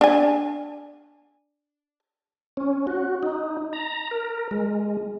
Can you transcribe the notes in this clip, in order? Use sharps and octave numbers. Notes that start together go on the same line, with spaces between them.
D4 G#5
C#4
F#4
D#4
A#5
A#4
G#3